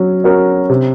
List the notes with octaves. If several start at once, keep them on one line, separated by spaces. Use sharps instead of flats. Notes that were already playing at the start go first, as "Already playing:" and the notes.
Already playing: F#3 C#4
C#4 F#4 A#4
C3